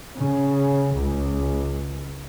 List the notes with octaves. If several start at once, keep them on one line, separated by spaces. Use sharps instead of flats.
C#3
C#2